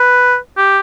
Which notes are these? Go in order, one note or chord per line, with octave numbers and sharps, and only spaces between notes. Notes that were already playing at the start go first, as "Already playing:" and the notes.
Already playing: B4
G4